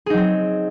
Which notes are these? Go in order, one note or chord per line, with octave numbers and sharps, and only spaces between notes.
F#3 C4 D#4 G#4